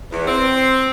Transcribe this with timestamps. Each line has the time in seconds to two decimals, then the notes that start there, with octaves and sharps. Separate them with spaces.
0.12 E2
0.27 C4